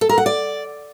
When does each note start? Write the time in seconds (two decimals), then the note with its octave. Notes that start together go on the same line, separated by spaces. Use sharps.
0.01 A4
0.09 A#4
0.18 F#5
0.26 D5